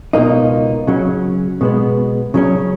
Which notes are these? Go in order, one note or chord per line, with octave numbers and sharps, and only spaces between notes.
C#2 B2 A#3 D#4
C#3 F#3 C#4
B2 G#3 B3
C#3 F#3 C#4